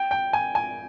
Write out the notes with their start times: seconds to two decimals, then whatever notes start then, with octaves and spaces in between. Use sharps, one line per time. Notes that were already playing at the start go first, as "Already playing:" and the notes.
Already playing: G5
0.11 G5
0.33 G#5
0.55 G#5